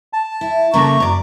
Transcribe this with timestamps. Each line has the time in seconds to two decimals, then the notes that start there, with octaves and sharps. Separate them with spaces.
0.13 A5
0.41 E4
0.74 C#3 A3 A#3 A#5 C#6
1.00 F#2 D5